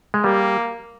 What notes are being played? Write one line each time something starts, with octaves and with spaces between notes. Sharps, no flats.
G#3
G3 A#3